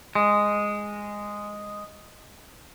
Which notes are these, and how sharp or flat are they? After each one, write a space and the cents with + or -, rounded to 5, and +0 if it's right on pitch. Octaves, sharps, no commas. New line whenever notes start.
G#3 -5